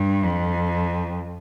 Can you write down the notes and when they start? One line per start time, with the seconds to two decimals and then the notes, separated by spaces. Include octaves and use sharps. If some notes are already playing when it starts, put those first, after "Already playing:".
Already playing: G2
0.23 F2